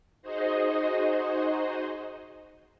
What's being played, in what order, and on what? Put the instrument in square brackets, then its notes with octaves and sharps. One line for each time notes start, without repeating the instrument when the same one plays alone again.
[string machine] D#4 F#4 G#4 C5 D#5